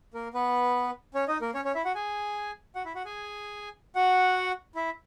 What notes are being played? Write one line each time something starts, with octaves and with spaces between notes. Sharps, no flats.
A#3 A#4
B3 B4
C#4 C#5
D#4 D#5
A#3 A#4
C#4 C#5
C#4 C#5
E4 E5
F#4 F#5
G#4 G#5
F#4 F#5
E4 E5
F#4 F#5
G#4 G#5
F#4 F#5
E4 E5